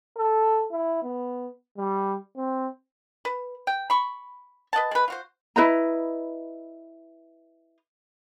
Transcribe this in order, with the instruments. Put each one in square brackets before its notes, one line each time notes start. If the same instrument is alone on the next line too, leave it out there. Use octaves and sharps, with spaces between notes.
[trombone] A4
E4
B3
G3
C4
[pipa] B4
G5
B5 C#6
B4 D#5 F#5 A5
G#3 B4
F4 F#4 C5
[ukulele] E4 B4 D#5 A#5